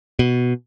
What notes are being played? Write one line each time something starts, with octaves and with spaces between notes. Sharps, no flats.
B2